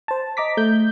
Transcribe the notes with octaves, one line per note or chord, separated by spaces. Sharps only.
C5 A5
D#5 A#5 D6 B6
A3 G6